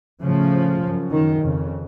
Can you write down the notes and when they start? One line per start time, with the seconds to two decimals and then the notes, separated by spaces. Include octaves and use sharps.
0.21 A2 C#3 F3
0.81 F#2 C#3
1.11 D#3
1.41 F2 C#3